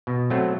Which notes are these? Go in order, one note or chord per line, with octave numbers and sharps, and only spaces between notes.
B2
F#3 A3 C4